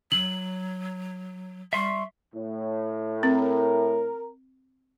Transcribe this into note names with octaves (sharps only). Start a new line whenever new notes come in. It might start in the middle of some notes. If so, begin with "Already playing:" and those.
F#3 F#7
G3 E5 C6 C#6
A2
C4 A#4